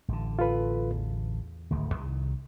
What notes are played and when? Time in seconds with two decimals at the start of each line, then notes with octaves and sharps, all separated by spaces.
0.08 A1 D3
0.39 F4 A4 B4
0.91 E2
1.71 D1 G#1 D2
1.94 C2 D#3